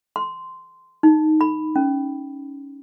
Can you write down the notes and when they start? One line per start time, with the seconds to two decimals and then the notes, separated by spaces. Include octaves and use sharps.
0.16 C6
1.03 D#4
1.41 B5
1.76 C#4